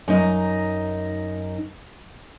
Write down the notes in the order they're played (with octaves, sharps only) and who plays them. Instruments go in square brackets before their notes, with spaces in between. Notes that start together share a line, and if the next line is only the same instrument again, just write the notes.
[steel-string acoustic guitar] F#2 D#4